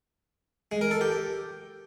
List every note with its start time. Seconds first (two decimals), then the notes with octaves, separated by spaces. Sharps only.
0.72 G#3
0.81 A#4
0.91 A4
1.01 G4